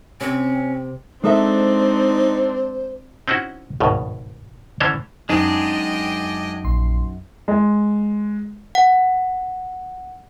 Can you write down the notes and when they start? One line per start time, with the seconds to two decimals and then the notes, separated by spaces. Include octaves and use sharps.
0.21 C3 C4 C#4
1.24 G#3 C4 D4 D#4 A4 C5 E5
3.28 C4 C#4 D#4 E4 F#4
3.80 G#1 C#2 G2 B2
4.80 D3 E3 C#4 D4 C5 C#5
5.29 F#2 G#3 D4 D#4 G#4 D#5 G5
6.64 A#1 C6
7.48 G#3
8.75 F#5